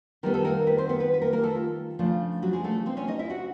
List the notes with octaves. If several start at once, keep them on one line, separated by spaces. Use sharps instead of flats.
D#3 G3 B3 A#4
A4
A#3 A#4
B3 B4
C4 C5
B3 B4
B3 B4
B4
A#3 A#4
A#3 A#4
A3 A4
F4
C#3 F3 A3 D4
F#3 F#4
G#3 G#4
A3 A4
C4 C5
C#4 C#5
D#4 D#5
E4 E5
F#4 F#5